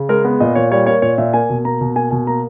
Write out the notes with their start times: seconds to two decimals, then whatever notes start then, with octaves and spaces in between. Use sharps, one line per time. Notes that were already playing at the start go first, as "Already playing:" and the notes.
Already playing: C#3
0.09 G#3 A#4
0.25 B3
0.40 A#2 D#5
0.55 A#2 C#5
0.71 G3 C#5
0.87 A#3 C#5
1.02 A#2 C#5
1.18 A#2 E5
1.34 A#3 G#5
1.49 B2
1.65 A#3 A#5
1.81 B2
1.96 A#3 G#5
2.11 B2 G#5
2.27 A#3 A#5